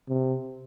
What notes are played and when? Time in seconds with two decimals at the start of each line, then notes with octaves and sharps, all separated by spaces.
0.09 C3